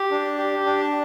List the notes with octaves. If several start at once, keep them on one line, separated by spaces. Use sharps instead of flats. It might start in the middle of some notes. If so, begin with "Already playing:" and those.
Already playing: G4
D4
G4
D4